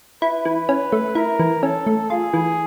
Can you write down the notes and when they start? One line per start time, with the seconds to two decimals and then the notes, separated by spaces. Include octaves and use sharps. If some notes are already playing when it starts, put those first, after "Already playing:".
0.22 E4 B4
0.45 E3
0.69 C#4
0.92 A3
1.15 E4 A#4
1.40 E3
1.63 C#4 A4
1.87 A3
2.10 F4 G#4
2.34 E3